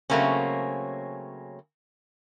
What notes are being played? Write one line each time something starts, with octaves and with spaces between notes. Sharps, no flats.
C#3 F#3 A3 A#3 C4 C#4